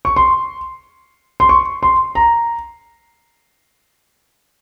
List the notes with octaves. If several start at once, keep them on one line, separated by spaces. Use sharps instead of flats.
C#6
C6
C6
C#6
C6
A#5